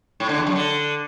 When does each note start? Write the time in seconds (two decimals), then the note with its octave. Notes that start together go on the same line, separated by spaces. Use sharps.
0.20 A2
0.29 D3
0.38 E2
0.47 F#2
0.55 D3